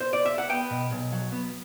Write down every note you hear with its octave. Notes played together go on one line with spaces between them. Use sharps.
C5
D5
E5
F#5
B3 G5
B2
B1
F#3
B3